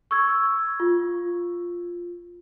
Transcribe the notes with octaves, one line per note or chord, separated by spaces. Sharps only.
C#6 E6 G#6
F4